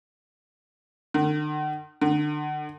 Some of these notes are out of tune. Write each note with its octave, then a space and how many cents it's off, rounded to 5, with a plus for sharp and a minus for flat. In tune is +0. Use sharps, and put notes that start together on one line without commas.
D3 +45
D3 +30